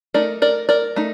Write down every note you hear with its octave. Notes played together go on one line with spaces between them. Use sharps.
A3 D#4 A#4 D5
A#4 D5
A#4 D5
A3 D#4